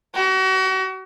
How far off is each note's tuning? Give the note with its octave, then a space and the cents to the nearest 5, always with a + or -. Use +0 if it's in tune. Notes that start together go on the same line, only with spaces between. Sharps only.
F#4 +35